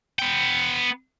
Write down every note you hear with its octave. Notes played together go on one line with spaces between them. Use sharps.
B3 G5